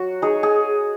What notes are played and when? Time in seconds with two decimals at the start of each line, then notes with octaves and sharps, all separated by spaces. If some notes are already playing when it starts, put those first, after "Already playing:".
Already playing: F#3 F#4
0.22 D#4 G#4 C#5
0.43 G#4